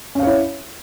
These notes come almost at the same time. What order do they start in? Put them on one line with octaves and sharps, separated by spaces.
C#4 F5 C#5 E4